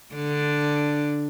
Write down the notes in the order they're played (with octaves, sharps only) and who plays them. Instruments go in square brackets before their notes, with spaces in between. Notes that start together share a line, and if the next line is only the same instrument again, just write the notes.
[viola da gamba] D3 D4